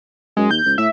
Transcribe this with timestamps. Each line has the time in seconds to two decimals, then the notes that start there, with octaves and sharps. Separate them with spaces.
0.37 F#2 G#3
0.51 D#2 G6
0.65 C#2
0.78 A2 E5